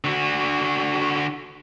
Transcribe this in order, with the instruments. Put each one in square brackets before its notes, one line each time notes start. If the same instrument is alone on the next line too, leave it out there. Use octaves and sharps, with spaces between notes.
[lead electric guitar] D3 F#4